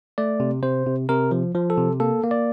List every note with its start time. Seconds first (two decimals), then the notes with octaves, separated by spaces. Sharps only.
0.18 A3 D5
0.40 C3
0.63 C3 C5
0.86 C3
1.09 C3 A#4
1.31 F3
1.55 F3
1.70 A4
1.78 C3
2.00 A#3 A4
2.23 A#3
2.31 D5